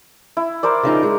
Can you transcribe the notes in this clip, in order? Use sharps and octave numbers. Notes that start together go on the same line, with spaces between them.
E4
A#4 C5 D5
C#3 F3 D#4
G#3